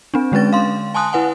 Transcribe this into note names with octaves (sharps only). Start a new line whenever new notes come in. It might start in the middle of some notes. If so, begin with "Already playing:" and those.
C4 D4
D3 G#3 C#4 B4 A6
F5 C6
G#5 A5 C6 D#6 F#6
E4 B4 F#5 G#5